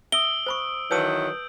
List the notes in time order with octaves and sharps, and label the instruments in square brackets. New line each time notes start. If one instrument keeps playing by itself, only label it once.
[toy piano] E5 [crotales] D#6 E6 D7 [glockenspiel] G7
[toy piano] C5 B5 C#6
[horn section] D#3 E3 F#3 [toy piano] B4 A5 D#6 [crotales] G6